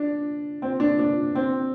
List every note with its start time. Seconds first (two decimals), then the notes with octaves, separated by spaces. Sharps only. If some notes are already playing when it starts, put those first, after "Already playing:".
Already playing: D4
0.62 C4
0.80 D4
0.99 D4
1.35 C4